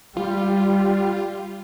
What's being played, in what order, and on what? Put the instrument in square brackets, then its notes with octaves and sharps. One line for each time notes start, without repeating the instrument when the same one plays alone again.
[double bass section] G3 [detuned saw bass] F4